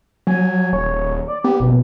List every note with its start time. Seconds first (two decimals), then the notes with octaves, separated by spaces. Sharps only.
0.27 F#3 G#5
0.73 D#1 C#5
1.28 D5
1.44 B3 G4
1.60 F#1 B2